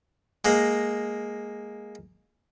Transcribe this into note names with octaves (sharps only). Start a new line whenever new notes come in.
G#3 A#3